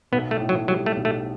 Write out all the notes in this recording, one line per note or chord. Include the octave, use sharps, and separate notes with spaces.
B1 B3
A3
A2
F#3
F#3 G3
A3
B1
A3